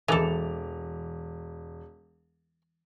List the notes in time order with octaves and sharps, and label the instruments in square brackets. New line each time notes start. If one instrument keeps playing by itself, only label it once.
[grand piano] E1 D6 F7 [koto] E3 A4 [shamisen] G#3 A#3 G#4